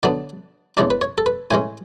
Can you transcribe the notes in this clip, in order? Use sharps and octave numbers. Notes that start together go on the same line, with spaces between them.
D3 F#3 B3 D4 D5
E2 C#3 G#3 D4 D5
B4
C#5
A4
B4
A2 E3 G#3 C#4 G#5